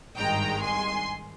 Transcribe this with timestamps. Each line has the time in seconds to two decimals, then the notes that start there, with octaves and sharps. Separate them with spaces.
0.18 G#1 G2 D#3 G#3 G5 A#5
0.62 G#5 C6